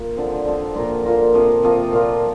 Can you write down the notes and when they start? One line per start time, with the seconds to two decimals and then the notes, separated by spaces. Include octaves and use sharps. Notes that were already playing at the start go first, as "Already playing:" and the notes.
Already playing: A#3 F4
0.16 D3 F3 C4
0.45 D3 F3 C4
0.75 A#2 A#3 F4 A#4
1.04 A#2 A#3 F4 A#4
1.34 C3 F3 A#3
1.63 C3 F3 A#3
1.93 A#2 A#3 F4